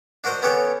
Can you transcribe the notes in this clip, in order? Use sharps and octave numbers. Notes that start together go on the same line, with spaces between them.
D4 F#4 A#4 C5 D#5
B3 C#4 G4 A4 C#5